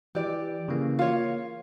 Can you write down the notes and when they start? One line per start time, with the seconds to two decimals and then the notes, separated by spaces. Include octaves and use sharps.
0.15 E3 G4 D5
0.68 C#3 E3 A#3
0.99 A#3 F4 C#5